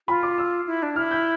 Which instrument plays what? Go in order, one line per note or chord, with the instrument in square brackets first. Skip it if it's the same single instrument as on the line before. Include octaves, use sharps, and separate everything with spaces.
[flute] F4 [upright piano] B5
[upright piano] D6
E6
[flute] E4
D4
[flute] E4 [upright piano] F6
[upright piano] G6